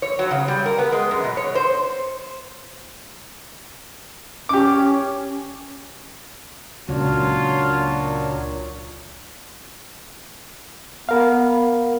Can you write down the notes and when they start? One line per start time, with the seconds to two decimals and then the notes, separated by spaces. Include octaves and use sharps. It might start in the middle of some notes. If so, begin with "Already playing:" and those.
0.02 C#5
0.19 F#3
0.31 C#3
0.48 G3
0.66 A#4
0.78 B3
0.92 G#3
1.11 F#2
1.24 B2
1.37 C#5
1.55 C5
4.49 C#4 G4 D6
6.89 C#2 A#2 F#3 D4 F4 F#4 C#5
11.09 B3 A#4 F5